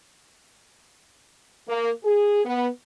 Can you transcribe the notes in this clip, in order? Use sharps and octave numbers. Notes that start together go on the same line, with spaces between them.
A#3
G#4
B3